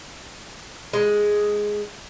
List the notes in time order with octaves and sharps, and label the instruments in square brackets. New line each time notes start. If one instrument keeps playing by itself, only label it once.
[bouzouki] G#3